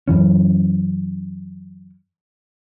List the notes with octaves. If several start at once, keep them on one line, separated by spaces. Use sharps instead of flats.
F#2 E3 C#4